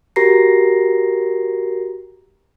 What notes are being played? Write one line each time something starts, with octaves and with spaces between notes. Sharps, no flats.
F#4 G4 A#4 A#5 A#6 C7